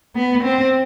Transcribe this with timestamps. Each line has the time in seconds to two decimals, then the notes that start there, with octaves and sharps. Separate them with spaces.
0.15 B3
0.43 C4